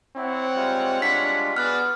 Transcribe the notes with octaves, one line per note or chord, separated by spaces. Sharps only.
C4 E4 C#5 F#5
G3 G#3 F4
D4 B6
B3 F#4 G#4 D5 F6 F#6